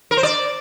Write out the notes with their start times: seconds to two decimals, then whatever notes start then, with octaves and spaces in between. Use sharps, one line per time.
0.11 A#4
0.17 C5
0.23 D5